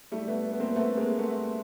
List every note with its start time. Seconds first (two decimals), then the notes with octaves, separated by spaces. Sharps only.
0.12 G3 A3
0.27 A3 B3
0.53 B3
0.60 A#3 C4
0.76 A3 B3
0.97 G#3 A#3
1.19 A3 B3